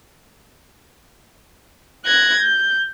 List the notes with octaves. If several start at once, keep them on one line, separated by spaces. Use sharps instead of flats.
F#6 G#6 A#6
G6